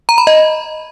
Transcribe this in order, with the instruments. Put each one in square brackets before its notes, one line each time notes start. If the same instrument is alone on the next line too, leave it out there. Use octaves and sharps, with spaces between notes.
[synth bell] A#5
B5
D#5